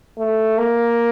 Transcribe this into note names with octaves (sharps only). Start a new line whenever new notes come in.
A3
A#3